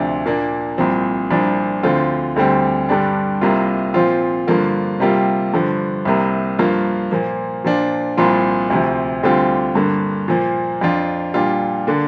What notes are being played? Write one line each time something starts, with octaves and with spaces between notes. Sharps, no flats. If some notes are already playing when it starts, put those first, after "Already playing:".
Already playing: D2 C3 F3 D4 F4
A#2 A#3 D4
C2 A#2 F3 C4
C2 A#2 F3 D4
D2 D3 F3 C4 F4
D2 D3 G3 C4
G2 D3 G3 D4
C2 C3 A#3 F4
A#2 F3 C4 F4
G2 D3 F3 A#3 F4
C3 G3 A#3 F4
G2 D3 F3
C2 C3 A#3
G2 F3 A#3 F4
A#2 F3 A#3
A#2 F3 D4 F4
C2 A#2 F3 C4 F4
D2 C3 F3
D2 D3 G3 C4 F4
G2 D3 A#3
A#2 F3 A#3
F2 F3 D4 F4
A#2 G3 D4 F4
D3 A#3 D4